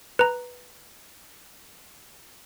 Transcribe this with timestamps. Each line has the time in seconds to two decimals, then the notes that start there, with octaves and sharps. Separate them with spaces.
0.19 B4 A#5